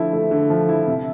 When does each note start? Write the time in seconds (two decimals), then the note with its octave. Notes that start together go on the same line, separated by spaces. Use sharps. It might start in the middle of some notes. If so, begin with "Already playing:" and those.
Already playing: D3 F3 A3 E4
0.13 A3
0.31 D3
0.50 F3
0.69 E4
0.87 C3